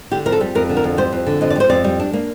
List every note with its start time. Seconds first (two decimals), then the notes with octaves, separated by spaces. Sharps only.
0.11 D3 G4
0.26 F2 A#4
0.32 A4
0.41 G3
0.55 F2 A#4
0.69 D3
0.77 A#4
0.84 F2
0.97 G3 C5
1.12 F2
1.27 D3
1.41 F2 D#5
1.51 D5
1.56 G3 C5
1.70 F2 D5
1.84 G3
2.00 D4
2.13 A#3